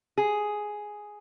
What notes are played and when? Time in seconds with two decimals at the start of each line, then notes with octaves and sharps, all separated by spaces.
0.18 G#4